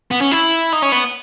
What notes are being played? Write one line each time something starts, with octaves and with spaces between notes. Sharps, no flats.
B3
C#4
E4
D#4
C#4
B3